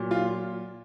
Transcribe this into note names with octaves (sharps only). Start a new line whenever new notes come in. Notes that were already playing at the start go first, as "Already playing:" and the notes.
Already playing: A#2 F#3
F4